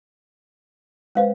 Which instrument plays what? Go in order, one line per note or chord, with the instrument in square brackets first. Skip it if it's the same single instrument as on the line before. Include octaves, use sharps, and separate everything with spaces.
[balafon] G#3 B4 C5 [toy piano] C#4 F5